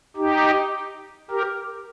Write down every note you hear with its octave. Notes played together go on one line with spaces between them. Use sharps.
D#4 G4
G4 A#4